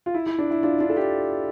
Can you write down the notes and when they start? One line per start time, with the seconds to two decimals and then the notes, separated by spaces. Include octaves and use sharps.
0.06 F4
0.14 E4
0.26 E4
0.38 D4
0.51 E4
0.63 D4 F4
0.80 D4 F4
0.89 A4
0.96 E4 G4